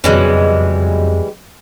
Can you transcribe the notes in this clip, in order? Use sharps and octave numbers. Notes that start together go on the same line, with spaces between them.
F#1 F2 B2 E3 G3 G#3 C#4